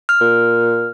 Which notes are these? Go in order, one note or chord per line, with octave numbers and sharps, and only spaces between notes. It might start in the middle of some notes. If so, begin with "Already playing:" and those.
F6
A#2